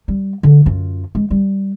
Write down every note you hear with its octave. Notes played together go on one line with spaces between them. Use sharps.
G3
D3
F#2 F4
G#3
G3